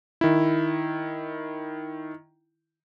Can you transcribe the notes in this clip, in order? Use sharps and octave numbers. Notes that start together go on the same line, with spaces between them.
D#3 E4